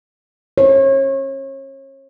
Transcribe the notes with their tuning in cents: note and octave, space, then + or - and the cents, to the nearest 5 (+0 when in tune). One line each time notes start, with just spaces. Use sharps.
C#5 -35